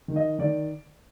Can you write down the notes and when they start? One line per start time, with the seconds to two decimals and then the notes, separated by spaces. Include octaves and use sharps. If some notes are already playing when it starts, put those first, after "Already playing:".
0.08 D#3
0.16 D#5
0.39 D#3 D5